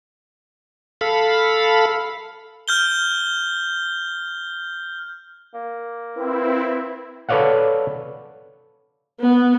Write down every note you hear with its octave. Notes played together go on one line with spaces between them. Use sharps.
A4 F5 B5
F6 G6 G7
A#3
C4 E4 B4
A4 B4 C#5 D5 F5 F#5
B3